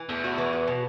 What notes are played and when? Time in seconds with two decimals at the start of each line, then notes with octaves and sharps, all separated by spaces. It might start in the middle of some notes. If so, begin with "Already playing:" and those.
Already playing: E3
0.09 E2 A3
0.24 F#4
0.38 E3
0.53 F#4
0.67 B2